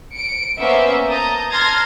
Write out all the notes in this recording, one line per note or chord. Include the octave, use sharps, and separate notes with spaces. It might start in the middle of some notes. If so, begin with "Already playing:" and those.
C#7 D7
A#3 B3 C#4 C5 E5
A5 A#5 D#6 G6
A5 A#5 C6 F6 G#6 A#6